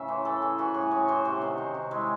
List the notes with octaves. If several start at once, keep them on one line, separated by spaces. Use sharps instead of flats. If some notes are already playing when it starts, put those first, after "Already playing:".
Already playing: A2 C#3 A3 E5
E3 C5
E3 A4
E3 G#4
E3 F#4
A2 G#4
A2 C#5
E3 C5
C3 F#4
D#3
D#3
C3
G#3 E4